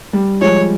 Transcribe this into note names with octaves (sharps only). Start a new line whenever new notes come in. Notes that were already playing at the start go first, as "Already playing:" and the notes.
G3
F3 G#3 C#5